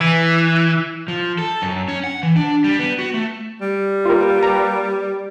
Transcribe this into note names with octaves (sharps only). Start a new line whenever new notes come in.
E3
F3
A4
F#2
C#4
F#5
E3
D4
G3
B3
F#4
A3
G3
A#3 F4 G4 A#4 B4
A#5